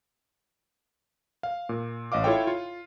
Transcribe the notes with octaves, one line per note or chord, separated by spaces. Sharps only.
F5
A#2
A1 D#5 F5 D6
E4 F4 A4 C#5 G5
F4